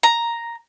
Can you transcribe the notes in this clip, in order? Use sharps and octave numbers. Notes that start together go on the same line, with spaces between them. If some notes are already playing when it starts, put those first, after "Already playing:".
A#5